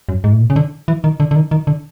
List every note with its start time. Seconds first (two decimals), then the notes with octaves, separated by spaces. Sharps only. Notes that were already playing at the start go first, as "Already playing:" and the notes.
0.09 F#2
0.24 G#2
0.32 A2
0.41 A#2
0.50 C#3
0.56 D3
0.88 E3
1.04 D#3
1.20 D3
1.31 D3
1.36 D#3
1.51 D#3
1.67 D3